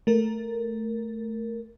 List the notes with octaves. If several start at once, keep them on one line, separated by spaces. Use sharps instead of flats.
A3 A#4